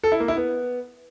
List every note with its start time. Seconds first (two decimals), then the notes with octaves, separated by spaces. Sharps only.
0.04 A4
0.12 E4
0.20 A#3
0.28 E4
0.37 B3